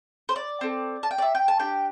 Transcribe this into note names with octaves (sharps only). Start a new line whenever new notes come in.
C5
D5
C4 A4
A5
G5
D5
E5
G5
A5
D4 G4 G5